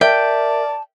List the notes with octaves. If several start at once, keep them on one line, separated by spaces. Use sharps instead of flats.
A#4 D5 E5 G5 A5